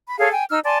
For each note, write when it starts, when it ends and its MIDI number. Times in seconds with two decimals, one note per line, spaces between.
0.08 0.19 83
0.20 0.29 68
0.20 0.29 69
0.20 0.29 73
0.20 0.29 77
0.31 0.44 79
0.31 0.44 80
0.50 0.59 63
0.50 0.59 88
0.50 0.59 89
0.64 0.78 74
0.64 0.78 80
0.64 0.78 81
0.64 0.78 84